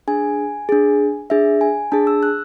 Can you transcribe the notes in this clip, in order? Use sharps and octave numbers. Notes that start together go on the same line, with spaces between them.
D4 G#4 G#5
D4 G#4
D4 G#4 E5
G#5
D4 G#4 A5
E6
F#6